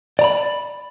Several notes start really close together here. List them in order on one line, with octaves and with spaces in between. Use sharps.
D5 A#5 B5